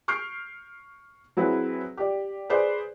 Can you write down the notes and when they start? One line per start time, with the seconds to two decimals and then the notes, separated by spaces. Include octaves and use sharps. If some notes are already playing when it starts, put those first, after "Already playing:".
0.08 C#6 F6 G6 C7 D7
1.37 F#3 C4 E4 G#4 B4
1.97 G4 D5
2.50 G#4 B4 C5 D5